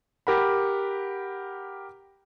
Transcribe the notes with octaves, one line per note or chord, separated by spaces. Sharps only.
G4 A#4 F#5 B5